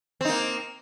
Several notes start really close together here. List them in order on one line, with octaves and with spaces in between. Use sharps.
C4 D#4 A#3